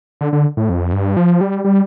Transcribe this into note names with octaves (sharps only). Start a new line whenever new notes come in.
D3
D3
A2
F2
G2
F3
G3
G3